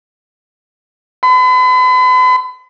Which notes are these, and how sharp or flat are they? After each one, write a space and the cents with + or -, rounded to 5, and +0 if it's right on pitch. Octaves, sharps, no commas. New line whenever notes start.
B5 +40